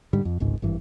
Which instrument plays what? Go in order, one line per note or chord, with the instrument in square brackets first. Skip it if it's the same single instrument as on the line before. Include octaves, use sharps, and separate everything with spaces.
[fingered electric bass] G#2 D3 G3
F2
D1 G#1 C#2 G#2
G#1 G2 E3